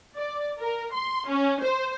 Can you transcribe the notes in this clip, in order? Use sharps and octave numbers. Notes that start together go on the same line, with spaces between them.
D5
A#4
C6
C#4
C5